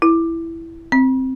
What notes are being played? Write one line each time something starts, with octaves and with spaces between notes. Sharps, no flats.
E4
C4